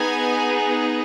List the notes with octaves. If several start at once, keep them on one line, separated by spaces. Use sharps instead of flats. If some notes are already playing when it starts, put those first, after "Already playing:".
Already playing: B3 D#4 G#4 G#5